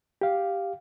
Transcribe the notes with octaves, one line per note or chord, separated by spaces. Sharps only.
G4 F5